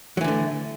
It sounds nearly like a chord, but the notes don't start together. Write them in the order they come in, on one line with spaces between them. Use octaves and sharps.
F#3 E3 D3 A3